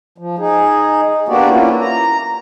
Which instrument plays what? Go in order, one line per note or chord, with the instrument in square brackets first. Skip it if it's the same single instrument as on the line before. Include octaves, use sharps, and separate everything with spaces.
[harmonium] F3
D#4 G#4
A#3 B3 D4 F#4 G4 D5
A#3 C#4 E4 F4
A#5